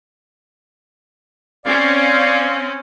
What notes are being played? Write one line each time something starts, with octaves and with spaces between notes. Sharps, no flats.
C4 C#4 D5 F5